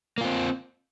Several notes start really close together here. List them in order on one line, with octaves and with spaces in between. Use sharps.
A#3 F4 C4